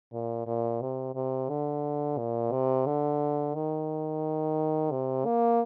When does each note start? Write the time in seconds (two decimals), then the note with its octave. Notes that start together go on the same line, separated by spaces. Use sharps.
0.13 A#2
0.46 A#2
0.82 C3
1.15 C3
1.49 D3
2.18 A#2
2.51 C3
2.86 D3
3.55 D#3
4.91 C3
5.25 A#3